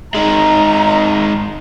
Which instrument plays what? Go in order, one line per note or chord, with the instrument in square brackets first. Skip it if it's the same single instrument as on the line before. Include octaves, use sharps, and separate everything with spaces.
[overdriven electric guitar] D#3 G#3 [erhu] A#5